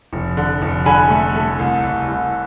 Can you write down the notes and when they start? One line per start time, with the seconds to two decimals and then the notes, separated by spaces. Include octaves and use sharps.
0.13 F1
0.37 D3
0.62 F1
0.86 D3 G#5 B5
1.10 A3
1.35 A3
1.59 C2
1.83 C2
2.08 C2